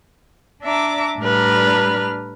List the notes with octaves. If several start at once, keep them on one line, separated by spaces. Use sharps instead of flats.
D4 E5 A#5 D6
A2 G3 D4 B4 A#5 F6